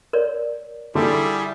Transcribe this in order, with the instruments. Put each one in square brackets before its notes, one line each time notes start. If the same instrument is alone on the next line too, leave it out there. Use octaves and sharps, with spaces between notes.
[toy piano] A#4 C#5 D5
[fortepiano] D3 [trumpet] G3 [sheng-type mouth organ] E4 G#4 E5